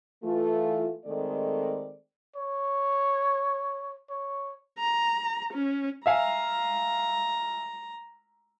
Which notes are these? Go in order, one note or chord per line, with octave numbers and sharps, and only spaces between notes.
E3 A3 F4
D#3 G#3 A3 C4 A4 D5
C#5
C#5
A#5
C#4
E5 F5 G#5 A#5